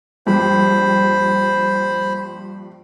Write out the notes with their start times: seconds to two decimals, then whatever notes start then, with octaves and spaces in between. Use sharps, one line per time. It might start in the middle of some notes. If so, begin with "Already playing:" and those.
0.27 A#1 G2 C5 B5